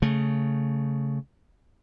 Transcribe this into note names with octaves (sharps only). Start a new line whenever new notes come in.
C#3 A3